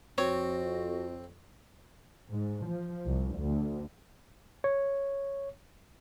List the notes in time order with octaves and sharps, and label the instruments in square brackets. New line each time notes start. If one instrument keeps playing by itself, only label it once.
[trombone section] F2 [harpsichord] C4 [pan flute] F#4 [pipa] C#5
[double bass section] G#2
F3
C2
D2
[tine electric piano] C#5